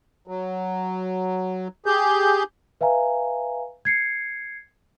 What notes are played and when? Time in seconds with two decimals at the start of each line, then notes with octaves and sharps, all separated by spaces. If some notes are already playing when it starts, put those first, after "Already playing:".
0.28 F#3
1.86 G4 G#4 G6
2.81 B4 E5 F5 G#5 A#5
3.85 G#6 C7 C#7